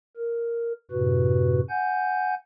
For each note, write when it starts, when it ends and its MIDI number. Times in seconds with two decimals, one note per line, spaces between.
0.16 0.72 70
0.91 1.61 42
0.91 1.61 45
0.91 1.61 48
0.91 1.61 66
0.91 1.61 71
1.70 2.35 78
1.70 2.35 80
1.70 2.35 91